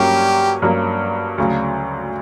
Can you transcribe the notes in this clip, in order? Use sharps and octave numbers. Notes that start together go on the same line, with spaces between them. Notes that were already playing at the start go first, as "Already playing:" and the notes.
Already playing: G2 F#3 A#3 C#4 G4
G2 F#3 A#3 C#4
D2 C#3 F#3